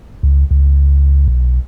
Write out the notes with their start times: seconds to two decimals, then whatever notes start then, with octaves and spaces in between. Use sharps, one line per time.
0.23 C#2
0.51 C#2
1.27 B1